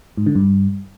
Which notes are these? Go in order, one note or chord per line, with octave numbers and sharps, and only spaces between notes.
G#2
D3
G2